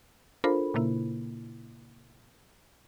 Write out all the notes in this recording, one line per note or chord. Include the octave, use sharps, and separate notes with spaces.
D4 F4 A4 A#4 C5 B5
A#2 C#3 A#3 E4